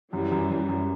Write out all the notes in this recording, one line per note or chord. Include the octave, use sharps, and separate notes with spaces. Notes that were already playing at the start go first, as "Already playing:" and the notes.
F#2 E3 G3
F#2
F#2
F#2